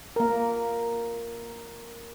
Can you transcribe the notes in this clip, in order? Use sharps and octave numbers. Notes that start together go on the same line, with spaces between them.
A#3 A#4